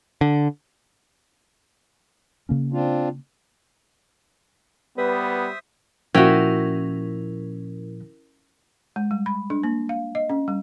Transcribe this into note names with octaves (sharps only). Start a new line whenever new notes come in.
D3
C#3 A#3 C#4
C4 D4 F4
G3 B3 B4 C5 E5 D#6
A#2 F3 C#4 E4 F#4 A#4 E5 G5
G#3
G3
B5
D4
A#3
F5
D#5
C#4
G3